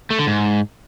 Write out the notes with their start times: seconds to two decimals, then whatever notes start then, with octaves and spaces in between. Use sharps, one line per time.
0.10 A3
0.19 D3
0.27 G#2